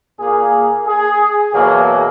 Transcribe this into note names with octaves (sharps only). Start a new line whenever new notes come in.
A#2 A#3 G#4
G#4
E2 B2 F#3 A#3 G#4